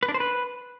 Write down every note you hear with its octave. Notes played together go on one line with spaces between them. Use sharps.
B4
D4
C5
B4